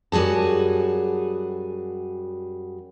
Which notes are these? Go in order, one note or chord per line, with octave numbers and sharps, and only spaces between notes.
F#2 G3 F#4 G#4 A5